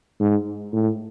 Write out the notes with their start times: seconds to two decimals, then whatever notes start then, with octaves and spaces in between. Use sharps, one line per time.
0.20 G#2
0.73 A2